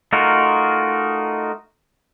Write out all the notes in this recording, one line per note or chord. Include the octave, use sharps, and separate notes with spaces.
A3 D#4 F4 F#4 A#4